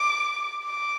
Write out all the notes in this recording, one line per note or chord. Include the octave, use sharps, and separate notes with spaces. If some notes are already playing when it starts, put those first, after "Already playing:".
Already playing: D6
D6